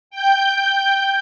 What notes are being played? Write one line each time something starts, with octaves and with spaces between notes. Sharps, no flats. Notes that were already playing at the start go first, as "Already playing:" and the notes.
G5 G6